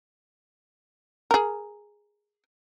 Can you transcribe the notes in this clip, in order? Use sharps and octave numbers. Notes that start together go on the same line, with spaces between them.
G#4 A#4